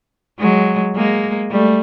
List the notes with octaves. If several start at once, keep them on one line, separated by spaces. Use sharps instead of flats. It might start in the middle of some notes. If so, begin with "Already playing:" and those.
F#3 G#3
G#3 A#3
G3 A3